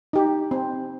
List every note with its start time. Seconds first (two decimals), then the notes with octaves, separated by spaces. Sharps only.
0.13 D#4 G4
0.51 C4